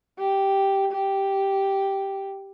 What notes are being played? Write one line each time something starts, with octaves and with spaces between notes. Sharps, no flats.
G4
G4